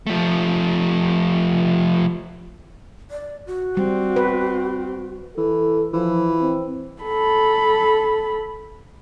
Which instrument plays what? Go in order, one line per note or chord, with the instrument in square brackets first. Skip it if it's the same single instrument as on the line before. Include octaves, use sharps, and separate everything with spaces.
[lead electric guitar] F3 A3
[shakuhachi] D5
F#4
[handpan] G3 [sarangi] C4
[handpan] B4
[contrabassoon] E3 [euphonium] A4
[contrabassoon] E3 [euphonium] F3
[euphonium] C4
[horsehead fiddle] A4 B5